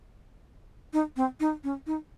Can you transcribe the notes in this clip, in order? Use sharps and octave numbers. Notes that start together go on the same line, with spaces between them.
D#4
C4
D#4
C#4
D#4